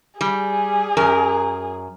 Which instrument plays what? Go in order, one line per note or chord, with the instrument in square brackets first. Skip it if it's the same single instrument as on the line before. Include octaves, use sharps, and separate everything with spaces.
[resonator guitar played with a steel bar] G3 [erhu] G#4
[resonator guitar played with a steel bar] F#2 A#4